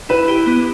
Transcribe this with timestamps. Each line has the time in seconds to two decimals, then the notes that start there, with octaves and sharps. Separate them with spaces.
0.09 E4 B4
0.28 G4
0.46 B3